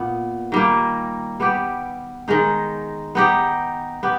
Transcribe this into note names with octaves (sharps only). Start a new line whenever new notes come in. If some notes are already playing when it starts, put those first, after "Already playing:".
Already playing: A#2 B3
D#3 G3 A#3
G3 B3 G4
D#3 G#3 D#4
B3 D#4 G4
B3 G4